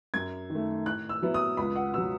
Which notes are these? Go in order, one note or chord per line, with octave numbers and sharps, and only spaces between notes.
F#2 G#6
D#3
A3
A2 F#6
E6
F#3 B3 E4
D#6
C#2 B5
F#5
B2 F#3 E6